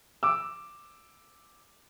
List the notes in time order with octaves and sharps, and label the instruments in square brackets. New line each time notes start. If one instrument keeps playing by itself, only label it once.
[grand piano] D6 E6